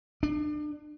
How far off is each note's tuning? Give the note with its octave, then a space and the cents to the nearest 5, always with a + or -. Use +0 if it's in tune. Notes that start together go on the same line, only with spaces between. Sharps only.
D4 +30